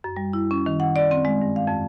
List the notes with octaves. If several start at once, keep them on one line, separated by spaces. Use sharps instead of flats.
F#2
G3
E4
C#4
D#3
F#5
D5
C4
G#3
G2
F5
F2